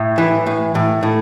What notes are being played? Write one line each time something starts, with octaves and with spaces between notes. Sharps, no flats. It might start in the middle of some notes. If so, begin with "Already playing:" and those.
Already playing: A2
E3
A2
A2
A2